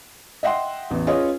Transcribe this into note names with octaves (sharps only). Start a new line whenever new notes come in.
D#5 E5 F#5 G5 C6
A1 E2
C#4 F4 G#4 B4 C#5 D#5